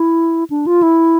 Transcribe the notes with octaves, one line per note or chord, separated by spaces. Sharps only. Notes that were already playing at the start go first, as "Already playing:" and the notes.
Already playing: E4
D4
F4
E4